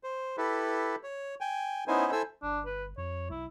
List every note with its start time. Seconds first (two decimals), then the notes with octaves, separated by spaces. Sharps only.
0.04 C5
0.38 E4 G4 A4 B4
1.03 C#5
1.41 G5 G#5
1.88 B3 C#4 D#4 E4 C5 G#5
2.12 E4 A4 C5 G#5 E6
2.43 G1 D4
2.66 B4
2.98 F2 C#5
3.30 B1 E4